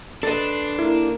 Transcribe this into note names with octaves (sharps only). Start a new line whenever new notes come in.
D4 A4 B4 D#5 C6
A#3 E4